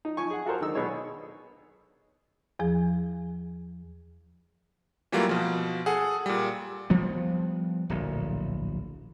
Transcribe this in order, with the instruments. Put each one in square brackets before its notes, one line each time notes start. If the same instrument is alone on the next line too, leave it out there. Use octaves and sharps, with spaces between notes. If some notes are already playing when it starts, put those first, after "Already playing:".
[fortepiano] D#4
F3 G#5 C#6
G#4 F#5
F4 F#4 A4 A#4 C5
D3 D#3 G#3 D#4 E6
B2 D4 D#4 G#4 C#5
[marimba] E2 F3 G#4
[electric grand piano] E3 F#3 G3 A3 A#3 F4
B2 F3
G#4 A4 F#5
A#2 G3
[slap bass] F3 G3 B3
D1 A#1